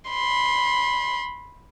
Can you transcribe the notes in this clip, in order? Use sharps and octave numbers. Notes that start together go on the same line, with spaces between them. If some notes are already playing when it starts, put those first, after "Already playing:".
B5 C6